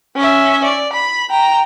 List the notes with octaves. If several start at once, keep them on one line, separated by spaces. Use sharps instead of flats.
C#4 E5
D5
B5
G5 A#5